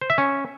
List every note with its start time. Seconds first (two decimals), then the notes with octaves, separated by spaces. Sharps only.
0.01 C5
0.10 E5
0.18 C#4